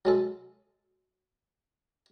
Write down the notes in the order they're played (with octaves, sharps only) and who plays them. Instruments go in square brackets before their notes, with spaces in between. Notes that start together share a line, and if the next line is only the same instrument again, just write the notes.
[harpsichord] F#3 G#3 A4